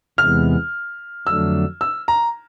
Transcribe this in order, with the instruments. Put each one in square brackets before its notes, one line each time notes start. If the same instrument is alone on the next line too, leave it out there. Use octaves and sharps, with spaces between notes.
[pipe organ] E2 C3 E3 G#3 B3 [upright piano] F6
[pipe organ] F2 D3 F#3 A3 D4 [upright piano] E6
[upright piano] E6
A#5